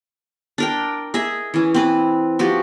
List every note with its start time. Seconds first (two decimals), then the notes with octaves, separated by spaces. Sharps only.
0.58 D4 A#4 G5
1.14 G#4 D#5 E5
1.54 E3 C#4
1.74 C4 B4
2.39 F3 F#4 G4